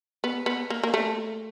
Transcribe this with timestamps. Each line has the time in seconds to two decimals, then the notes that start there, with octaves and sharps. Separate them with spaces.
0.24 B3
0.46 B3
0.70 A#3
0.83 A#3
0.94 A3